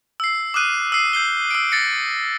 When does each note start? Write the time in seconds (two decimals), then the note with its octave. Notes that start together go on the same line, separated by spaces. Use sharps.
0.20 E6 C7
0.54 D6 D#6 F6 F#6 D#7
0.92 E6 C7
1.13 E6 G6 C7 G7
1.51 E6 D7
1.72 A6 A#6 C#7